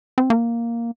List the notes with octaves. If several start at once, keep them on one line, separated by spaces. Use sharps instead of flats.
C4
A#3